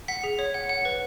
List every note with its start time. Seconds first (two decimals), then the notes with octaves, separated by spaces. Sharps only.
0.08 F#5 B6
0.24 G#4
0.39 C#5
0.54 F#5
0.69 F#5
0.85 B4